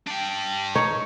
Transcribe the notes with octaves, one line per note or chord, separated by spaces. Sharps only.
D4 G5
D#4 C#5